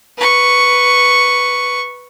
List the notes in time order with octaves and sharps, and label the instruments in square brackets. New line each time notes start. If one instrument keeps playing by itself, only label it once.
[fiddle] B4 C#6